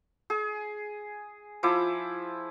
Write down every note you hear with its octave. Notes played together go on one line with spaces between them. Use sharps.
G#4
F3 E4 D6